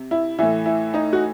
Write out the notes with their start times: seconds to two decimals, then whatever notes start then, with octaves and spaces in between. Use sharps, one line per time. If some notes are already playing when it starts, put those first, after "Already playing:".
Already playing: C3
0.11 E4
0.39 A2 E3 E4
0.66 E4
0.94 D#4
1.13 F#4